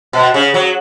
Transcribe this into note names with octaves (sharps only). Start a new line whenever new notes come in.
B2
C#3
F#3